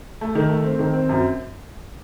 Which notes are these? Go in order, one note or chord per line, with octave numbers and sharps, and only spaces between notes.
A3
D#3
A3
C4
D#3
C4
F#2